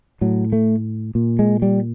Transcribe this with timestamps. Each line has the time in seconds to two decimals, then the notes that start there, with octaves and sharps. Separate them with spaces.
0.21 A2 F#3
0.52 A3
1.15 A#2
1.39 G#3
1.62 G3